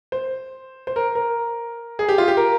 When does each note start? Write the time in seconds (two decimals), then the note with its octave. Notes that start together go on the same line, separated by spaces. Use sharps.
0.12 C5
0.87 C5
0.96 A#4
1.15 A#4
1.99 G#4
2.09 G4
2.18 F4
2.28 G4
2.37 A#4